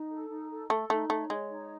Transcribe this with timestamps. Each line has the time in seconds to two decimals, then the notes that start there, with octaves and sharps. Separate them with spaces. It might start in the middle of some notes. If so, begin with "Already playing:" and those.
Already playing: D#4
0.10 A4
0.30 D#4
0.49 A4
0.70 A3 A4
0.89 A3 D#4
1.09 A3 C#5
1.29 G#3 C#5
1.50 D#4